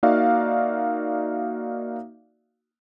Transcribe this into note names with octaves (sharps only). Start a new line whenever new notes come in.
A#3 D#4 F#4 D5 E5 F5